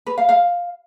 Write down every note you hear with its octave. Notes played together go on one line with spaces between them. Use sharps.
B4
F5
F5